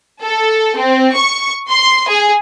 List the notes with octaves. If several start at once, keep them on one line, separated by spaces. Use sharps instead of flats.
A4
C4
C#6
C6
G#4